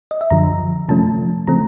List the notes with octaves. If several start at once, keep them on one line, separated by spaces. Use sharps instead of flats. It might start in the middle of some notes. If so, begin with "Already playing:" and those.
D#5
E5
F#2 D3 F3 A#5
C3 F3 A3 C#4 A5
C#3 F3 A3 C4 A#5